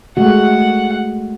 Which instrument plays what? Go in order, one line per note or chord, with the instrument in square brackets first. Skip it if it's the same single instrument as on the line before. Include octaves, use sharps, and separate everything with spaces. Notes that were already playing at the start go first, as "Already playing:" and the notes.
[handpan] G#3 A3 F#4 [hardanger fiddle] F#5